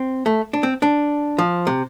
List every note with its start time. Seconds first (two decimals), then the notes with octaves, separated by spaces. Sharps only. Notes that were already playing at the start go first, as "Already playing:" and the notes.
Already playing: C4
0.26 A3
0.53 D4
0.63 C4
0.82 D4
1.38 F3
1.67 C3